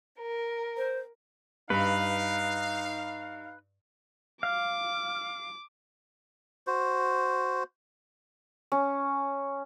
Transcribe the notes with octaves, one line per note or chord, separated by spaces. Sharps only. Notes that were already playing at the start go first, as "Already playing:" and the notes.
A#4
C5
G2 D#4 B4 F5 B5
F5 D6
F#4 C5
C#4